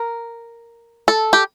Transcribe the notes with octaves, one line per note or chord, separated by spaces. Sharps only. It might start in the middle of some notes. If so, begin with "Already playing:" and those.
Already playing: A#4
A4
G4